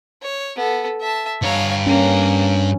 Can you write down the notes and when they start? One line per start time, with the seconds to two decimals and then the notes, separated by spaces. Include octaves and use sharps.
0.22 C#5
0.56 B3 A4
1.00 E5 A5
1.42 G2 C#5 F5 A#5
1.87 A#3 C#4